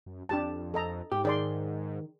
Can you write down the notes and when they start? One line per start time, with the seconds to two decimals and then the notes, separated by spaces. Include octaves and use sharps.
0.06 F#2
0.29 F2 D4 G4 A5
0.74 A4 D#5 A#5
1.12 G#2 G4
1.25 D#3 G#4 D5 C6